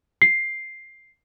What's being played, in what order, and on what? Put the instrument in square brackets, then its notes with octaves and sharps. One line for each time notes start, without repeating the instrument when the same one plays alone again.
[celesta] C7